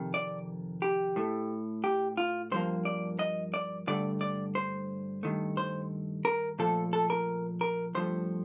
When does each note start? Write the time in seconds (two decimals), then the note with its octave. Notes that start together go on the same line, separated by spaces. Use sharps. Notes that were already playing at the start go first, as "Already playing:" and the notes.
Already playing: F2 C3 D#3
0.14 D5
0.82 G4
1.16 A2 A3
1.84 G4
2.17 F4
2.52 G2 F3 A#3 C5
2.85 D5
3.19 D#5
3.54 D5
3.87 G2 D3 A3 D5
4.21 D5
4.55 C5
5.23 G2 D#3 A3
5.57 C5
6.25 A#4
6.59 A#2 F3 A3 A4
6.93 A4
7.10 A#4
7.61 A#4
7.95 G2 F3 A3 C5